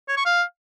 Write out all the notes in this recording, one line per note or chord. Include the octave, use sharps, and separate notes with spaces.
C#5
C#6
F5